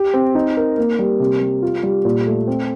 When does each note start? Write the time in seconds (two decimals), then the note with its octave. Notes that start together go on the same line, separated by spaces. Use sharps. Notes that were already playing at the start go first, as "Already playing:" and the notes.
Already playing: G4
0.14 C4
0.35 D#4
0.57 A#4
0.78 A#3
0.99 G3
1.20 C3
1.41 G3
1.62 F4
1.83 G3
2.05 A#2
2.26 A3
2.47 C4